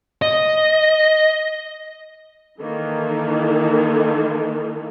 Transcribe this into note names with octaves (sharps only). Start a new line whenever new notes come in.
D#5
D#3 E3 A#3 A4